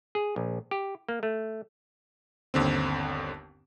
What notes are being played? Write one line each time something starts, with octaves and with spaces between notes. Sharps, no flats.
G#4
A#1
G4
A#3
A3
G1 D#2 D3 C4